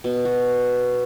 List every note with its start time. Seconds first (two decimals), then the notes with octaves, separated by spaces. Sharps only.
0.04 B2
0.25 F#4